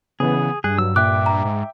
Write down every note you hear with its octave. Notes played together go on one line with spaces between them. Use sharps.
C#3 E3 B3 G#4
G2 G#4 F#6
F#3 E6
A#2 E5 G5 D6 F#6
A#5
G#2